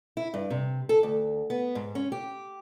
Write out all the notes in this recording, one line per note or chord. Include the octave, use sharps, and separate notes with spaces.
E4
G2
C3
A4
D2
B3
G#2
C#4
G4